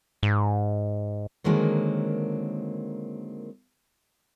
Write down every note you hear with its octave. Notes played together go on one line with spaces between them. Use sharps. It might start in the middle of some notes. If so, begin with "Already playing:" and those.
G#2
D3 D#3 F#3 G#3 A#3 C4